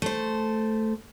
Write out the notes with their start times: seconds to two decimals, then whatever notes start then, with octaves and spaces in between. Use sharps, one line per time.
0.02 A3 C5